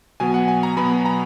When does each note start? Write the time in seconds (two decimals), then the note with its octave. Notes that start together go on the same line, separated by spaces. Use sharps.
0.20 B2 F#3 B3 G#5
0.34 F#5
0.48 G#5
0.63 A#5
0.77 B2 F#3 B3 B5
1.06 A#5